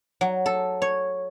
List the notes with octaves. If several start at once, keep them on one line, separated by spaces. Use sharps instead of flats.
F#3
A4
C#5